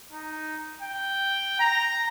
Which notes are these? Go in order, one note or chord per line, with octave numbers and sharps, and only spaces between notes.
D#4
G5
A#5